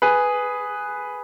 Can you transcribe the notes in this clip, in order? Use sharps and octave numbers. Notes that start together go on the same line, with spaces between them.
G#4 B4